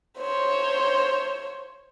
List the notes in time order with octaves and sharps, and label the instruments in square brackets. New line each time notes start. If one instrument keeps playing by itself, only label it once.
[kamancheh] C5 C#5